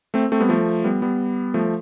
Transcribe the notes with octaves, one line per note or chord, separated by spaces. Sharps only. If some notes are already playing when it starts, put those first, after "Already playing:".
A3 C4
A3 C4
G3 B3
F3 A3
G3 B3
G3 B3
F3 A3